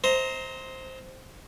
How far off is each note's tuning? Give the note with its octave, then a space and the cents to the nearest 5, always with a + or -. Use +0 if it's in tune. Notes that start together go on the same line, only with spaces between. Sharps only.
C5 +0 D#5 +45 A#5 +0